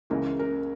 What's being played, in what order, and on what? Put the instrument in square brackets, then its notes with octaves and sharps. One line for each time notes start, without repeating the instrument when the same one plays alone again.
[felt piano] C#2 C#3 E3 A#4
A#4